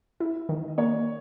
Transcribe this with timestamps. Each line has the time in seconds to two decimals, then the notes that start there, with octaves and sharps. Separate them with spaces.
0.20 E4 E5
0.49 D#3 D#5
0.68 D#5
0.78 A#3 C#5